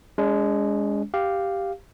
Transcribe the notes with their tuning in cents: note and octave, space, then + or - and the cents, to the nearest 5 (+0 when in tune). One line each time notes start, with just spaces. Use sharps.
G#3 -15 C#4 +45
G4 +0 F5 +0